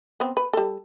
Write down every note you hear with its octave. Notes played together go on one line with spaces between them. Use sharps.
B3 C4
B4
G3 A4